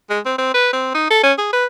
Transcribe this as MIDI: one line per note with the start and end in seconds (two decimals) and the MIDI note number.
0.10 0.20 56
0.26 0.34 60
0.38 0.50 60
0.54 0.70 71
0.73 0.90 60
0.94 1.08 63
1.10 1.20 69
1.23 1.33 61
1.38 1.48 68
1.53 1.65 71